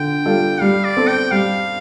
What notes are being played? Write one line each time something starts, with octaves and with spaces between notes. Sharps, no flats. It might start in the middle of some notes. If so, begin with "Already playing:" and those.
Already playing: D3 F4 G5
G3 F4 A4
G3 F5
D5
C4 A4
G5
G3 F5